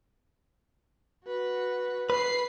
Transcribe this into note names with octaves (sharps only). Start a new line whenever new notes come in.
F#4 B4
B4 B5 C7